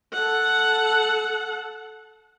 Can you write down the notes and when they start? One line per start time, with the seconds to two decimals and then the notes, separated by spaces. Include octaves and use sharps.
0.13 A4 F#5